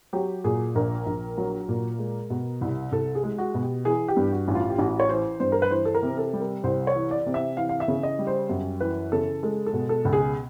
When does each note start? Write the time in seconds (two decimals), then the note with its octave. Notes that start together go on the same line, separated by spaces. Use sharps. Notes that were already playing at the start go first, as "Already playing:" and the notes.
0.13 F#3 G4
0.44 A#2 G#4
0.75 A#1 A#4
1.06 A#1
1.38 F#3
1.68 A#2
1.99 G#3
2.30 B2
2.61 C2
2.92 C2 A4
3.15 G#4
3.23 G#3
3.38 F#4
3.55 B2
3.62 G4
3.85 E3 G#4
4.08 G4
4.17 G2
4.32 F#4
4.48 A1
4.55 F4
4.70 G4
4.78 A1 F#4
5.00 C#5
5.09 E3 C5
5.40 G2 C5
5.52 A#4
5.62 B4
5.71 E3 C5
5.85 A4
5.95 A#4
6.03 C3
6.18 A4
6.33 G3
6.41 A#4
6.64 C2 C5
6.87 C#5
6.95 E3
7.11 D5
7.26 C3
7.34 E5
7.57 E3 F5
7.69 F5
7.80 E5
7.88 C#3
8.03 D#5
8.19 G3
8.27 C5
8.49 F#2
8.80 E3 B4
9.12 C#3 A4
9.43 G#3 A4
9.66 A4
9.73 B2
9.89 A4
10.05 C#2
10.13 G#4